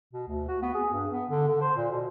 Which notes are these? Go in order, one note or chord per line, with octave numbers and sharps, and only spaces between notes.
B2
D2
F#4
B3
G#4
G2
B3
D3
D3
C5
A#2
B2